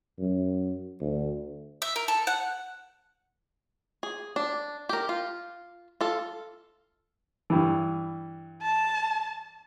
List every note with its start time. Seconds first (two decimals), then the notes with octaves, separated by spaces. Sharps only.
0.19 F#2
1.01 D2
1.82 E5
1.96 A#4
2.08 A4
2.27 F#5
4.03 G#4
4.36 D4
4.89 G4 A#4
5.09 F4
6.01 F4 A4
7.50 G2 E3
8.63 A5